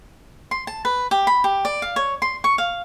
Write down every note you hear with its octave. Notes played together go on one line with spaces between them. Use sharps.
C6
A5
B4
G4
B5
G4
D5
F5
C#5
C6
C#6
F5